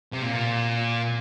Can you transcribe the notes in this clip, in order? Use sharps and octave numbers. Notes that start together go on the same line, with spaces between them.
C3
A#2